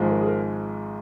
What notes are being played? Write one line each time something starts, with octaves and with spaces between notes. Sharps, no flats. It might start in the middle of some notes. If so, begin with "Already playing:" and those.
Already playing: G#1 G#2 F3 G#3
A#4
G#4
A#4